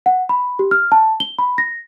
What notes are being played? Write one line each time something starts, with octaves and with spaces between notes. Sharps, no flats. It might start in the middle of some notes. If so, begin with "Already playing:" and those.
F#5
B5
G4
F6
A5
G7
B5
A#6